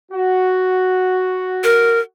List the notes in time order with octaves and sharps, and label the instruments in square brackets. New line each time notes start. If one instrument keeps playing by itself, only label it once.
[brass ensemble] F#4
[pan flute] A#4